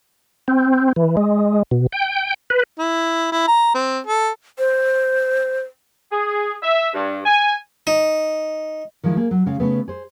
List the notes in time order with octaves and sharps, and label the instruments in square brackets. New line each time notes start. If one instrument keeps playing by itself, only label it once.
[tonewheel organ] C4
E3
G#3
B2
G5
B4
[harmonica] E4
E4
A#5
C4
A4
[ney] C5
[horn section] G#4
E5
G2
G#5
[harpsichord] D#4
[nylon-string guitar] D#3 F3 G#3 E4
A#3 G#4
F#3
C#3 G#3 G#4 F5
C#3 A3 B3
G#4 C5